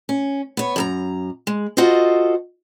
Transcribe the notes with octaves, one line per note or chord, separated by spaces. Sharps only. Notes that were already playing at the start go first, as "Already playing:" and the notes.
C#4
B3 C#5
F#2 A4 A#5
G#3
F4 F#4 A4 C5 D#5